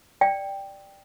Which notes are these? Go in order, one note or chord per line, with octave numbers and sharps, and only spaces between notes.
D5 G5